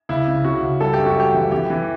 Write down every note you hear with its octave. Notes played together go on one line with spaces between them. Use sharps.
C#2 E4
C#3
C#3 F#4
C#2
G3 A4
F#2 G4
F#4
G3 G4
E3
E3 G4
E3